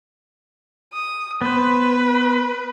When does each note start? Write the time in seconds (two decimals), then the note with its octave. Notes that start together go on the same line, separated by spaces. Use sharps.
0.93 D#6
1.41 B3 B4 C5